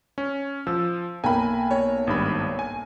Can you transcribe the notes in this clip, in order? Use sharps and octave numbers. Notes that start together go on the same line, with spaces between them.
C#4
F3 E6
B1 A#3 G5 G#5 B5
C#5
G#1 G2 B5
G#5